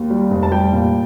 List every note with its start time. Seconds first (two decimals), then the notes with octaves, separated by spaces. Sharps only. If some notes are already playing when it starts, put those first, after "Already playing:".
Already playing: D#2
0.10 G3
0.31 F1
0.43 A5
0.51 G3 G5
0.72 A#2